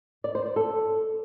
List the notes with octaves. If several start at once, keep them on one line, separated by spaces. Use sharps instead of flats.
D5
C5
D5
A4